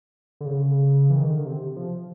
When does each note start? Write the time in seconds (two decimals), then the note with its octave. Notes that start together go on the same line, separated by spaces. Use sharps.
0.41 D3
0.46 C#3
1.10 E3
1.16 D#3
1.31 D3
1.46 C3
1.61 C3
1.77 F3